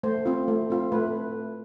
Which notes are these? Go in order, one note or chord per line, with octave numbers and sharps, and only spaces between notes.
A3 C5
C4 F4
A3
C4 F4
A3 B4